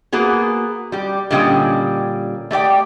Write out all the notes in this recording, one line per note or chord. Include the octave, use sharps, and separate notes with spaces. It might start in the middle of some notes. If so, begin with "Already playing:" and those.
A#3 B3 F#4 G#4
G3 G4
A#2 D3 G3 C#4 D#5 G5
A3 G4 D5 G5